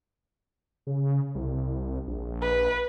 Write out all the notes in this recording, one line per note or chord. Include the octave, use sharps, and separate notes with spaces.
C#3
C2
A#1
B4